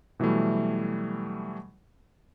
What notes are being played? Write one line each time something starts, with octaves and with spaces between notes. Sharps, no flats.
B2 E3 F#3 G3 A3